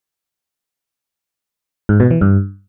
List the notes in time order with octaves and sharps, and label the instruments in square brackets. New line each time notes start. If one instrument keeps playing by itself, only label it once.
[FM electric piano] G#2
B2
E3
G2